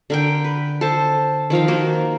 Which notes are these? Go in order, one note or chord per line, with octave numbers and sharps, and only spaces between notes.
D3 A#4 G5
B4
A4 C5 A5
D#3 F3 A#4 F5
D#3 A#3 F#4 C5